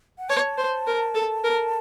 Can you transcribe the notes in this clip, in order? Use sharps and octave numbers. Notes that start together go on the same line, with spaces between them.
F#5
C#5 A5
C5
A#4
A4
A#4